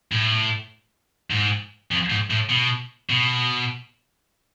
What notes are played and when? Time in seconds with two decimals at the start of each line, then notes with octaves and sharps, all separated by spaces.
0.12 A2
1.30 G#2
1.91 F2
2.10 G#2
2.30 A2
2.49 B2
3.10 B2